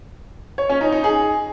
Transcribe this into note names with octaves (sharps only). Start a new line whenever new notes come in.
C#5
C#4
D#4
D#4
G#4